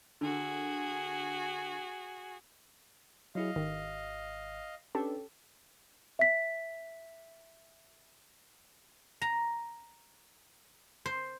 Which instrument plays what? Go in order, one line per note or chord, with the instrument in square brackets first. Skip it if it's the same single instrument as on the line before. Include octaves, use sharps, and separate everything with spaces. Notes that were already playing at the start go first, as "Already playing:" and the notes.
[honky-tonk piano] D3 [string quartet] F#4 G#4
[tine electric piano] F#3 E4 G#4 [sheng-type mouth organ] D#5 F5
[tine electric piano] G#1 [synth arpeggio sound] D#3
[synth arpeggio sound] C#4 G4 A4 [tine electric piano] D4 B4
[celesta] E5 B6
[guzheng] A#5
C5